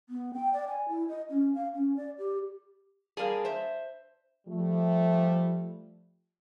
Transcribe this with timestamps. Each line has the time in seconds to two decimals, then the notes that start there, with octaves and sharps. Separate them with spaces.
0.09 B3
0.34 G5
0.53 D5
0.68 G#5
0.89 E4
1.09 D#5
1.30 C#4
1.55 F5
1.74 C#4
1.97 D5
2.19 G4
3.17 G3 A#3 D4 G#4
3.45 C5 E5
4.47 F3 G3 A3